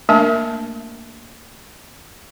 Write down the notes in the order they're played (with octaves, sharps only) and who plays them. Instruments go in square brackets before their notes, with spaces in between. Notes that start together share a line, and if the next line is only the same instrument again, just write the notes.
[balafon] A3 A#3 D4 A#4 E5 A5